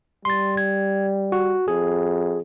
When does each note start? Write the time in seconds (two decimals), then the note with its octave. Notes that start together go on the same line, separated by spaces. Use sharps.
0.25 G3 C6 A6
0.57 G#6
1.32 F#4
1.68 F2 G#4